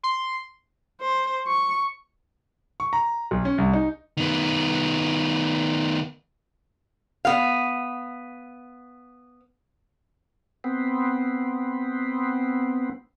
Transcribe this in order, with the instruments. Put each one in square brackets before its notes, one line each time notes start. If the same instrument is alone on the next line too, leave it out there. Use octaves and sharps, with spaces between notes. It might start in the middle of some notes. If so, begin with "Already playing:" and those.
[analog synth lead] C6
[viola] C5
C#6
[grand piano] C#6
A#5
B1
C#4
C2
D#4
[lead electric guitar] D#3 B3
[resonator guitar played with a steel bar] B3 F5
[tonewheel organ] B3 C4